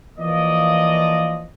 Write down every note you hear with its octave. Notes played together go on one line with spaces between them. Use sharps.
E3 F3 A#3 D5 D#5